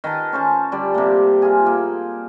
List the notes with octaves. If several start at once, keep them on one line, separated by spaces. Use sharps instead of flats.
D#3 B4 A5
C#4 C5 A5
D3 G3 D5
C3 A#3
F4 G#4
A#3